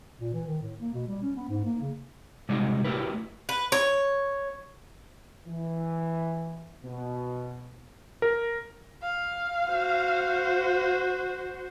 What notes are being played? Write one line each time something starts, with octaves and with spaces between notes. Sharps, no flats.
A#2
E3
D#3
A2
A#3
B2
G3
C#4
B3
G#2
A#3
C#3
C3 G3 G#3 D#4 F#4
A3 E4 F#4 G4 A#4 B4
B4
C#5
E3
B2
A#4
F5
F#4 C5